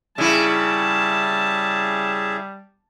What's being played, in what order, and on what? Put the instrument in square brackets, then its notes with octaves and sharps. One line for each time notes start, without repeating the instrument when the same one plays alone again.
[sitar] C#3 E4 [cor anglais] G3 [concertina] G#4 E5 [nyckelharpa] A5